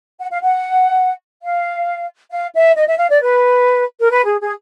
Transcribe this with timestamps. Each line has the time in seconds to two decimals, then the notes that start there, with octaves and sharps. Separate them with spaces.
0.19 F#5
0.31 F5
0.42 F#5
1.43 F5
2.32 F5
2.55 E5
2.77 D#5
2.88 E5
2.99 F5
3.11 D5
3.21 B4
4.00 A#4
4.11 B4
4.25 G#4
4.41 G#4